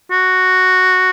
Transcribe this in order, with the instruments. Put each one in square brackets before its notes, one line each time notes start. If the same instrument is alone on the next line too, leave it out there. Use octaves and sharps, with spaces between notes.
[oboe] F#4